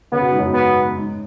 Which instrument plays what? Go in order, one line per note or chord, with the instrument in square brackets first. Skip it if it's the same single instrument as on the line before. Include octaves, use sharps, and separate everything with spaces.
[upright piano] C#3 [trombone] B3
[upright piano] B2
G#2
F#2 B2
[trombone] B3
[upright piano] G#2